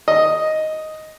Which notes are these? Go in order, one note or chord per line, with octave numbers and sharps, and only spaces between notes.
D#5